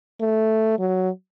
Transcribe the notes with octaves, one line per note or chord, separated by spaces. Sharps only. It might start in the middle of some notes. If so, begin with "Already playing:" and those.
A3
F#3